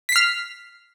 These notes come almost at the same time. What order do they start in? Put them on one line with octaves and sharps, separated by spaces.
B6 C7 F6